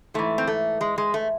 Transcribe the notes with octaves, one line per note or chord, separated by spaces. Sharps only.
G#2 E3 A3
C4
A3
G#3
G#3
A3